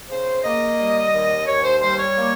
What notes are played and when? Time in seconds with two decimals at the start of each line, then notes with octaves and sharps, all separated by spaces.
0.10 C#3 C5
0.44 A#3 D#5
0.78 G3
1.13 D#2
1.46 D#2 C#5
1.64 C5
1.80 G3 C5
1.98 C#5
2.15 A#3